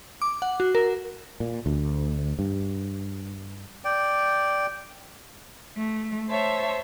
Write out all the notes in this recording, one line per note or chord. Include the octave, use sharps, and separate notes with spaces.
D6
F#5
F#4
A#4
A#2
D2
G2
D5 G5
A3
C5 C#5 E5 A5